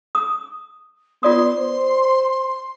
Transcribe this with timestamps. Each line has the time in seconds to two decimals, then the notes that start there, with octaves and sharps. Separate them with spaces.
0.15 D#6
1.23 B3 F4 D5 C6 D#6
1.58 C5